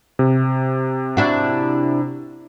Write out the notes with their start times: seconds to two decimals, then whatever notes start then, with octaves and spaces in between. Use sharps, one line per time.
0.19 C3
1.17 D4 E4 F#4